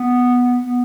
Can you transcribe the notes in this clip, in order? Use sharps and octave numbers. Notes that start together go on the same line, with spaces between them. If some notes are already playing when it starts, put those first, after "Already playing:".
Already playing: B3
B3